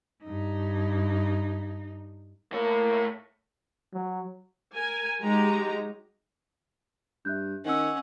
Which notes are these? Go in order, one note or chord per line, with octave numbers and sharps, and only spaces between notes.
G2 D#4
A2 A#3 C#5
F#3
A#4 G#5
F#3 G#3 D#4 G4 A#5
G2 E5 F#6 G6
D#3 C#4 D#5 F#5 E6